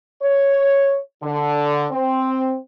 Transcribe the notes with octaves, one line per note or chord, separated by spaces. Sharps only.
C#5
D3
C4